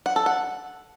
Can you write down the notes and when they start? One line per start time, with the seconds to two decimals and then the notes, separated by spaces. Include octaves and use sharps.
0.06 F#5
0.16 A4
0.26 F#5